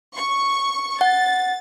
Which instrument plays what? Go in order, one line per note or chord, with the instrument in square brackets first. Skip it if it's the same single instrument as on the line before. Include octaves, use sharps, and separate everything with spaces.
[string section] C#6
[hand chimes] F#5 [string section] A6